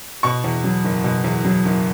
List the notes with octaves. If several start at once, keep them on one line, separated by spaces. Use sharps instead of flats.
B2 C#6
E2
F#3
F#1
B2
E2
F#3
F#1